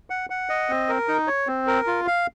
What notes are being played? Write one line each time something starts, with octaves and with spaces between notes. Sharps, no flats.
F#5
F#5
D#5
C4
A#4
D#4
C#5
C4
A#4
F4
F5